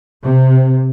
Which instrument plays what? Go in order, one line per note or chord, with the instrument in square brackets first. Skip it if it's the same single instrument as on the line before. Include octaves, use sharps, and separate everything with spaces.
[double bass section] C3